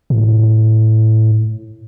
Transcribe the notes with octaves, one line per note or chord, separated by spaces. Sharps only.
A2